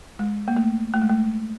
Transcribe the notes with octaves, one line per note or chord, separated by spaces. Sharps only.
G#3
A#3
A3
A3
G#3
A3